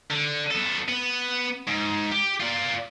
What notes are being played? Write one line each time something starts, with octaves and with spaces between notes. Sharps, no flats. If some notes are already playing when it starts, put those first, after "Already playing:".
D3
B3 A4
B3
G#2
G4
F4 D5